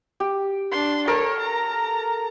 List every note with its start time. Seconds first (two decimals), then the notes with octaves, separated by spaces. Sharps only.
0.20 G4
0.72 D4 C6
1.07 A4 A#4 C#5
1.40 A#5